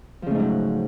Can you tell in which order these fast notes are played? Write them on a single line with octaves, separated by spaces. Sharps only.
F3 C#3 A3 G#2 F#3